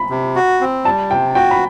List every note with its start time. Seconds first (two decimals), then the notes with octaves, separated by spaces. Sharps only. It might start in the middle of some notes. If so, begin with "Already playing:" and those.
Already playing: B5
0.10 C3
0.36 F#4
0.61 C4
0.85 G3 A5
1.10 C3 G5
1.35 F#4 G5
1.51 B5